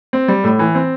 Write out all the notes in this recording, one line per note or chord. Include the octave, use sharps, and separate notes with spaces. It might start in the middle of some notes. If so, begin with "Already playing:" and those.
C4
G3
A2
E3
C4